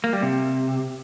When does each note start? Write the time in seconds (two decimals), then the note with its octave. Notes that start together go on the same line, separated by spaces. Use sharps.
0.04 A#3
0.13 G3
0.22 C3